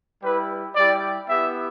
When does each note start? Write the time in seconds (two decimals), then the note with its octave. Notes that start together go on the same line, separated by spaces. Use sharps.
0.22 G3 E4 G4 B4
0.76 G3 E4 G4 D5
1.29 B3 E4 G4 E5